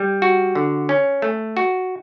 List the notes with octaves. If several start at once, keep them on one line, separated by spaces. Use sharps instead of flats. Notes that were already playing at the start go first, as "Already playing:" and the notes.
Already playing: G3
F#4
D3
C#4
A3
F#4